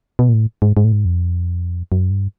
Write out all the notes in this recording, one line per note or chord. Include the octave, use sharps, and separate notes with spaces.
B2
A#2
A2
G#2
G#2
A2
G#2
F2
F#2
G2